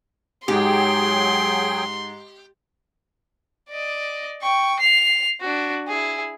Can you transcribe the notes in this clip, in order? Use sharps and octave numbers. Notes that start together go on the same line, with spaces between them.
G#2 F#3 G4 G#4 G5 C6
D5 D#5
G5 C#6
C7 F7
D4 F#4
E4 G#4